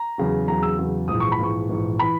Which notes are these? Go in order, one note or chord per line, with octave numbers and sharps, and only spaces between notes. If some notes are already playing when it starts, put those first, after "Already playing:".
Already playing: A#5
E2 C#3 F#3
E2 C#3 F#3 A#5
E6
E2 C#3 F#3
A#1 G#2 E3 D#6
C#6
B5
A#1 G#2 E3 C#6
A#1 G#2 E3
E3 B5